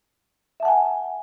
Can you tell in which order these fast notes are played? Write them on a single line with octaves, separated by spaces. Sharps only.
E5 A5 F#5 G#5